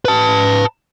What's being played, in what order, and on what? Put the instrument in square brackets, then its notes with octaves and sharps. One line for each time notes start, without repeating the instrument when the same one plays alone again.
[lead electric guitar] B4 A5